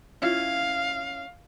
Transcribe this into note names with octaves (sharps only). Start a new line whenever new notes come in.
C#4 E4 F4 F5